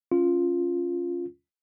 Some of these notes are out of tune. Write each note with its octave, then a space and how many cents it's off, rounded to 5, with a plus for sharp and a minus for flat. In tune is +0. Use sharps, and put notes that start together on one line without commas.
C#4 +0 F4 +0